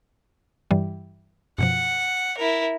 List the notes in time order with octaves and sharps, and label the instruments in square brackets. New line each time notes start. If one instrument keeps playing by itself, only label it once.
[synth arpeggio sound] G2 E3 G3
[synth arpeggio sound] F#2 B2 F3 [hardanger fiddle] F#5
[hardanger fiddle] E4 A#4